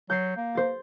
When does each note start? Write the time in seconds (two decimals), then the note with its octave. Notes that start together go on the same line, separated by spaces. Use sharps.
0.10 F#3 G6 A6 C7
0.37 A#3
0.55 C5 A6